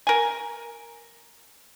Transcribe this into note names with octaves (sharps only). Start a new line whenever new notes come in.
A#4 G#5